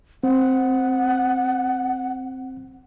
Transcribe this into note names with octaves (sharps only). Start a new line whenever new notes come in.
C4 F#5